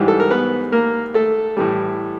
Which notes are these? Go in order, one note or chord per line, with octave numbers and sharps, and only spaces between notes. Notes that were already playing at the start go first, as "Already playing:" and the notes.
Already playing: G#2 E3 G3
A4
A#4
B3 B4
A#3 A#4
A3 A4
A2 E3 G3